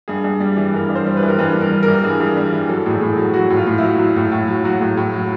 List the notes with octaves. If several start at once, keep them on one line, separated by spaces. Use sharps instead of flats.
G2 G#4
G2
G3
E3
G2 A#4
G2
C5
G3
B4
E3
A#4
G2 B4
G2
A#4
G3
A#4
E3
G2 G#4
G2
G3
E3
F#3 A4
A2 G#4
A2
F#3 A4
F#3 F#4
A2
F4
A2
F#3 E4
F#3
A2
A2
F#3
F#3 F#4
A2
A2
F#3